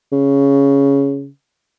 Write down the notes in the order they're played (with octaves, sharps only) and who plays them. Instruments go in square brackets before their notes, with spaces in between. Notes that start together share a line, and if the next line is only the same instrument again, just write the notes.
[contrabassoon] C#3